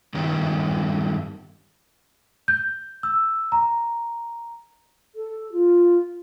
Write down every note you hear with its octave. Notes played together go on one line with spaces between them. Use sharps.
G2 D#3 G3 B3
G6
E6
A#5
A4
F4